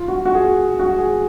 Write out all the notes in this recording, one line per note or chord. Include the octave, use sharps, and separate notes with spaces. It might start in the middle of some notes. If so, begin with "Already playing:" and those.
Already playing: F4
F#4
F#4
G#4
F#4
G#4